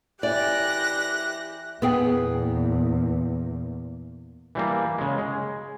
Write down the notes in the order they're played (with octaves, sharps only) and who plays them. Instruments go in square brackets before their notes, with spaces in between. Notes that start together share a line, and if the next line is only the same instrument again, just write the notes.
[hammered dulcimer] E3 [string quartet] G4 F#6 A#6 [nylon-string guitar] D5
[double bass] E2 A#2 [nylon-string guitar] B3 G#4 G5
[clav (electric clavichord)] E3 G3 A#3
C#3 G#3
G#3